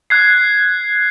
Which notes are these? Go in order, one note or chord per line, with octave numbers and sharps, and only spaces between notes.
F#6 G#6 C7